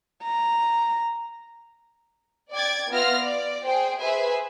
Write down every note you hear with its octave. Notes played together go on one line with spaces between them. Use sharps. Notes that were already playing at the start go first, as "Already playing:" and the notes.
A#5
D5 G5 D6 G#6 A6
B3 F4 E5 F6 A#6
D5
G#4 C5 G5
G#4 B4 C5 E5 G#5